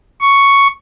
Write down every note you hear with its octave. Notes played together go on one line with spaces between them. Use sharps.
C#6